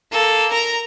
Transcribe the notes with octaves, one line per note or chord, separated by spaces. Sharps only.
A#3 A4
A#4 A#5